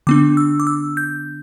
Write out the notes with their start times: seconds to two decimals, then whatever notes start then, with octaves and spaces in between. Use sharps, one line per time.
0.07 D3 B3 D4 D6
0.37 E6
0.60 D6
0.67 E6
0.97 G6